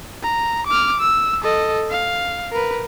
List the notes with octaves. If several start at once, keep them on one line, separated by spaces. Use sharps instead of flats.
A#5
D6 F6
E6
A4 D#5
F5
A#4 B4